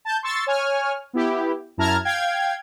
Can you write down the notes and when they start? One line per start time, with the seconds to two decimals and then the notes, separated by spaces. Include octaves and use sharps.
0.05 A5 G6
0.23 C6 C#6 E6 A6
0.46 C#5 G#5 F6
1.13 B3 E4 G4
1.77 F#2 E4 A5 A#5 F6 G#6
2.04 F5 G5 G#6